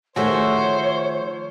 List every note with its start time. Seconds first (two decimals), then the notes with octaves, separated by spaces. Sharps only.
0.16 D#3 F3 A3 F#4 G#4 C5 C#5 E5